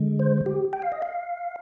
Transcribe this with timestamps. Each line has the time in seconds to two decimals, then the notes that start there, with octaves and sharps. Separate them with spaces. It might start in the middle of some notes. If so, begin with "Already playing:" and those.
Already playing: D3 G#3
0.19 C5
0.46 G4
0.73 G5
0.82 F5
0.92 D#5
1.02 F5